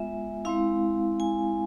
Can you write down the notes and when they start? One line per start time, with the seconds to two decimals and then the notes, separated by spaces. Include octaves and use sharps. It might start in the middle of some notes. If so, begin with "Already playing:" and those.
Already playing: G#3 B3 F4 E5 G#5
0.45 G#3 C4 E4 F5
1.20 G#5